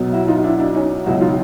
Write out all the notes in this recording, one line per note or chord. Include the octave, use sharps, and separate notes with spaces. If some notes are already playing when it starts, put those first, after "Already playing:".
Already playing: B1 B2 F#3
E4 F#4
D#4 F4
D4 E4
D4 E4
C#4 D#4
C#2 B2 F#3 E4 F#4
D#4 F4